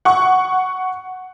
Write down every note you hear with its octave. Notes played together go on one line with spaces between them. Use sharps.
F#5 C#6